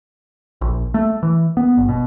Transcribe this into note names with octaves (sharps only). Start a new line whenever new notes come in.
A#1
A3
E3
B3
G1
B2